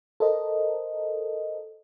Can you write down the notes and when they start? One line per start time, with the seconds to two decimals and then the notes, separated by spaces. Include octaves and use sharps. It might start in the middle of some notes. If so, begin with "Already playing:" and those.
0.20 A4 A#4 C5 D#5